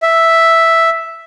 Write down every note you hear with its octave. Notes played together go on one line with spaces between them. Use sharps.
E5